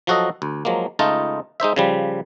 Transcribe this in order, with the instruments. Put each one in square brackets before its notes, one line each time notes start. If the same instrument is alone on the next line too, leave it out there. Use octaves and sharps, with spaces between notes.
[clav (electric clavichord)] F3 F#3 F#4 A4 D#5
D2
F3 F#3 G#3 A#3
C#2 A3 D#4 F4 D#5 A5
G#3 D#4 C5 E5
C#3 F3 G3